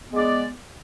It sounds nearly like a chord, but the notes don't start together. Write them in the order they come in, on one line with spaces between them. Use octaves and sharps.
B3 G#3 D5